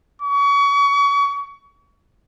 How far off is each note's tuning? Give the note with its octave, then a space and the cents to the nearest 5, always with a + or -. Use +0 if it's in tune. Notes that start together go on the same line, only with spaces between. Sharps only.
C#6 +35